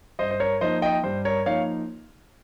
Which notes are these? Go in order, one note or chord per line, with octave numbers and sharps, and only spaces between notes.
G2 C5 D#5
C5
A#4 C#5
F3 A#3 D#4 C5 D#5
D#5 G5
G2 C5
A#4 C#5
F3 A#3 D#4 C#5 F5